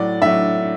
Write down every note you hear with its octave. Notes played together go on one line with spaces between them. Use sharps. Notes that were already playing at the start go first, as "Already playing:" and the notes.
Already playing: A2 F#3 D5
A2 F#3 E5